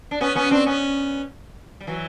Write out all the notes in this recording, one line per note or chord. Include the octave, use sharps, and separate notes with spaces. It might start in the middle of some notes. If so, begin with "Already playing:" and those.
D4
B3 C#4
B3 C#4
C4 D4
B3 C#4
G3
E3 F#3